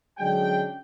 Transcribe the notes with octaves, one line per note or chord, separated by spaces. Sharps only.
D3 F#3 G#3 C#4 D4 G5